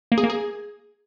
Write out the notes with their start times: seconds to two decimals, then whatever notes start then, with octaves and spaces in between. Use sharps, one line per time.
0.12 A#3
0.18 G#4
0.24 A#3
0.30 G#4